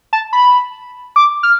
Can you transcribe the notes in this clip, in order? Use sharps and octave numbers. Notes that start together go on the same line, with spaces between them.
A5
B5
D6
F6